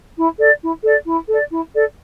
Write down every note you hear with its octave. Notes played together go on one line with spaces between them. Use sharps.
E4
A4 D5
E4
A4 D5
E4
A4 D5
E4
A4 D5